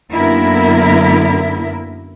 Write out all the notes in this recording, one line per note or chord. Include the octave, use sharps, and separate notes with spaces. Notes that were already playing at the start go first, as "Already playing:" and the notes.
F#2 D3 A#3 B3 E4 A#4